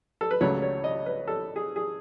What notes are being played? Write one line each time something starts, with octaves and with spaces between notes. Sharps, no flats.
A4
B4
C#2 C#3 F#3 A3 C#5
C#5
D#5
B4
A4
G#4
G#4